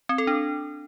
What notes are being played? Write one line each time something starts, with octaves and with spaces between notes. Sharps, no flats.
C4
A4
D4